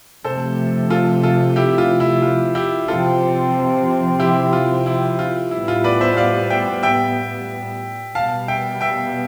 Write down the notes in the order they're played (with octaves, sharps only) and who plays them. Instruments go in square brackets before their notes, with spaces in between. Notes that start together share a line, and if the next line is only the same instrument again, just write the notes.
[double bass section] C3 F3 A3 [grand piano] A4 C5
[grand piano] F4 A4
F4 A4
E4 G4
F4
E4
F4
E4 G4
[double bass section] C3 F3 C4 [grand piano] F4 A4
[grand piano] E4 G4
F4
E4
F4
[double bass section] A2 G3 B3 [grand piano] E4
[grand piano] F4
B4 D5
C5 E5
D5 F5
E5 G5
E5 G5
[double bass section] B2 G3 B3 [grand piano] F5 A5
[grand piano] E5 G5
E5 G5